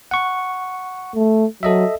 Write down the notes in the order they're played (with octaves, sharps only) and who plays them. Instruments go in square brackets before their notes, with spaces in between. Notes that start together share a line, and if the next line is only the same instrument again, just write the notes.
[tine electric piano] F#5 C#6
[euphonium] A3
[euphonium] F#3 [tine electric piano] A4 D#5 E5